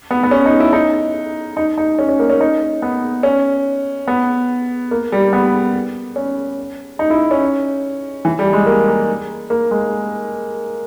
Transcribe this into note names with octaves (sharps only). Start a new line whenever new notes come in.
B3
B3
C#4
D#4
E4
D#4
D#4
D#4
C#4
C#4
A#3
C#4
D#4
B3
C#4
B3
A#3
G3
B3
C#4
D#4
E4
C#4
E3
G3
G#3
A#3
A#3
A#3
G#3